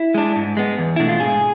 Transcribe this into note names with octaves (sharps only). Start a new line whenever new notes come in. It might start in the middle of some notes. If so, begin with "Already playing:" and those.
Already playing: E4
G#3 D4
G#2
G#3 B3
E2
B2 A3 D4 E4
F4
G#2 G#4